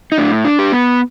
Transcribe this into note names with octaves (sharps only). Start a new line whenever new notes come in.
D#4
A2 D4
D4
G4
B3